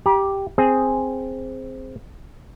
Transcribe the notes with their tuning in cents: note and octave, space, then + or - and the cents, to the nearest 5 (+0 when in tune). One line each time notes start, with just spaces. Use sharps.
G4 +0 A#5 +45
C4 +0 G#4 +0